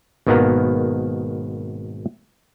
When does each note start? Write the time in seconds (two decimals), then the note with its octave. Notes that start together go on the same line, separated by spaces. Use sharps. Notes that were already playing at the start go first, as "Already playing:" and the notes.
0.27 G#1 B2 D#3 A#3 B3 A#5